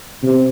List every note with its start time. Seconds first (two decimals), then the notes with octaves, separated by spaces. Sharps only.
0.23 C3